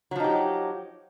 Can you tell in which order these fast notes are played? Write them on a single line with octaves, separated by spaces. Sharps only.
F#3 F3 D#4 G4